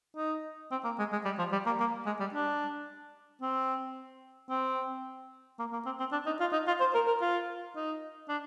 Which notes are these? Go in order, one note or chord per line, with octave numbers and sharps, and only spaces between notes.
D#4
C4
A#3
G#3
G#3
G3
F3
G3
A#3
A#3
G#3
G3
D4
C4
C4
A#3
A#3
C4
C4
D4
D#4
F4
D#4
F4
C5
A#4
A#4
F4
D#4
D4